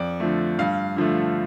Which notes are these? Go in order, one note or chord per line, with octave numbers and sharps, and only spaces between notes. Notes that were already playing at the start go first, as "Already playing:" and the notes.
Already playing: F2 D5
D3 F3 A3
G2 F5
D3 F3 A3